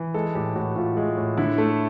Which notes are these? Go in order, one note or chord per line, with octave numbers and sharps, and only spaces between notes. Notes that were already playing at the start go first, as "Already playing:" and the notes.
Already playing: E3
G#3 A4
A2 G4
A2 F#4
A2 F4
G#3
A2
D3 E4
A3